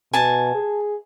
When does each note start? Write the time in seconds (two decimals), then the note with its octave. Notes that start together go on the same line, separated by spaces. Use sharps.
0.13 B2 G#5 A5
0.55 G#4